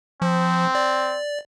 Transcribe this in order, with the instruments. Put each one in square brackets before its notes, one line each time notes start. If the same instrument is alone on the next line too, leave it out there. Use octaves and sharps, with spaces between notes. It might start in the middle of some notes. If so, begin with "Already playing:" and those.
[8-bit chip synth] F3 [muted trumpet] C4
[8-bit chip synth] D5